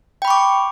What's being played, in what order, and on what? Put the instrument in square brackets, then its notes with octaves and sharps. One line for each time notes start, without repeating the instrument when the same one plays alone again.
[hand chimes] G5
B5
C#6
D6